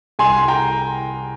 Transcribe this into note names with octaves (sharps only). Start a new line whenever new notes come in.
C2 G#5 C6
G5 A#5